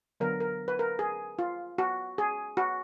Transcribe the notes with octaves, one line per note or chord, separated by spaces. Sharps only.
D3 F#3 B3 A#4
A#4
B4
A#4
G#4
F4
F#4
G#4
F#4